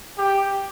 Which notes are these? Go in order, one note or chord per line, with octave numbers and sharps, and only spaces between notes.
G4